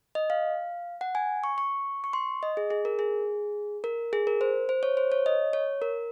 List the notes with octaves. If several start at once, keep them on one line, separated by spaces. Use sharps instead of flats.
D#5
F5
F#5
G#5
C#6
C#6
C#6
C6
D#5
G#4
G#4
A#4
G#4
A#4
G#4
A#4
C5
C5
C#5
C5
C#5
D#5
C#5
A#4